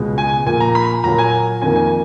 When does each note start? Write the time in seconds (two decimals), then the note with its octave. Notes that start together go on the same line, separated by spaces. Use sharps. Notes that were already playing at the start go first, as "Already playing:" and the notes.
Already playing: C#2 B2 G#3 B3
0.18 G#5
0.46 A#2 F3 A#3 G#5
0.60 A#5
0.75 B5
1.04 A#2 F#3 A#3 A#5
1.18 G#5
1.62 F2 D#3 A#3 G#5
1.76 G#5